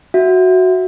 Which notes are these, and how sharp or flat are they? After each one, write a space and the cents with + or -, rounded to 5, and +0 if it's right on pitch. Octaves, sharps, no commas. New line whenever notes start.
F#4 +0 E5 +0